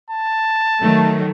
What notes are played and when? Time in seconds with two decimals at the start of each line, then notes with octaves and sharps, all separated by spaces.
0.10 A5
0.83 D#3 F#3 A3